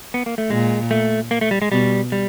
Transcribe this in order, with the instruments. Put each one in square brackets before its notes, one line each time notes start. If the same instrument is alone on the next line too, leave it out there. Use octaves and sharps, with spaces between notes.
[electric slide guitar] B3
A#3
A3
[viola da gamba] A#2 [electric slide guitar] G#3
[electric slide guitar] A3
A#3
A3
G3
G#3
[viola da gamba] B2 [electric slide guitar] G3
[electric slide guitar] G3